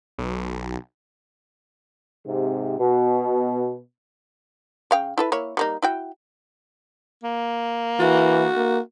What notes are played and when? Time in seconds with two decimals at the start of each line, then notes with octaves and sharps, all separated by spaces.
0.19 B1
2.25 G#2 C3
2.78 B2
4.91 C#3 F5 G5
5.18 E4 A4 B4
5.32 A#3 E4 C#5
5.57 G3 A#3 D#4
5.82 E4 F#4 G5
7.23 A#3
8.00 E3 F#4
8.56 A#3